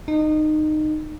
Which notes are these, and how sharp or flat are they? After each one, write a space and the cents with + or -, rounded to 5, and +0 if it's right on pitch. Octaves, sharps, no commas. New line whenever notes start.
D#4 -20